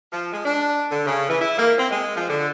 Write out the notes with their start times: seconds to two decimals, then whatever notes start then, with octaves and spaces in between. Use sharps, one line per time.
0.13 F3
0.32 G#3
0.45 D4
0.91 D3
1.06 C#3
1.29 E3
1.41 E4
1.58 A#3
1.78 C4
1.91 G#3
2.16 F3
2.29 D3